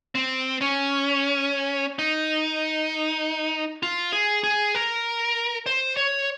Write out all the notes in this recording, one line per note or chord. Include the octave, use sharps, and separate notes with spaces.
C4
C#4
D#4
F4
G#4
G#4
A#4
C5
C#5